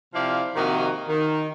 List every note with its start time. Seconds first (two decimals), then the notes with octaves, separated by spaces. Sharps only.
0.15 C3 F3 E4 D5 F5
0.56 C3 D#3 F3 A#3 F#4 D#5
1.09 D#3